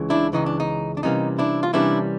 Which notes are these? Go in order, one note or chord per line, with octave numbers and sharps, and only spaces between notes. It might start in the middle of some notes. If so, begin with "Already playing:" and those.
Already playing: C#2 C#3 E3
D4 E4
C#2 C#3 E3 D#4
D4
D#4
D4
C3 E3 G3 A#3 C#4 D#4
D4 E4
F4
C3 E3 G3 A#3 C#4 D4 E4